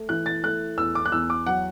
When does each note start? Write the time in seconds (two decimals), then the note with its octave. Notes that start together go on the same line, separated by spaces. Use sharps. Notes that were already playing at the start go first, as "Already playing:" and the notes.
Already playing: A3
0.09 E3 F#6
0.26 A6
0.43 A3 F#6
0.77 E2 E6
0.95 D6
1.06 F#6
1.12 E2 E6
1.30 D6
1.46 F#3 F#5